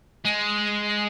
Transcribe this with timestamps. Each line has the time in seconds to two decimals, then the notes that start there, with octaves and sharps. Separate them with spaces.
0.25 G#3